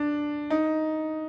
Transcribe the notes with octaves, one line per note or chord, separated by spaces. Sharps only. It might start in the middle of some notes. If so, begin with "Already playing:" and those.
Already playing: D4
D#4